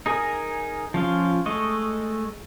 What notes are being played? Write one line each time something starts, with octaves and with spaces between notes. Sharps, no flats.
D#4 G#4 A#4 G#5
F3 C#4 F4
G#3 A3 D#5 C#6